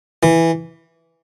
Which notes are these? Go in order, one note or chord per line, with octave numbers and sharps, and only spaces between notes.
E3